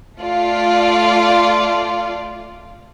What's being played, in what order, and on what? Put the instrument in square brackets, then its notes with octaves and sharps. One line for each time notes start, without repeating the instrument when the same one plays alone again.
[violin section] A3 F4 D5